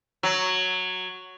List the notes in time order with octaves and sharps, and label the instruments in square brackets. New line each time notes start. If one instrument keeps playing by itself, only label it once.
[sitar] F#3